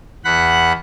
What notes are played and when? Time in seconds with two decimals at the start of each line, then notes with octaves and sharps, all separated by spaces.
0.25 E2 F#5 B5 F#6